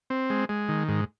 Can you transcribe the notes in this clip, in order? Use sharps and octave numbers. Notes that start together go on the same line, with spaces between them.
C4
G#3
G#3
D#3
G#2